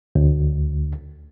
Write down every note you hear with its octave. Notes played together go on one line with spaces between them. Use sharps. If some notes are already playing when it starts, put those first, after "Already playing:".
D2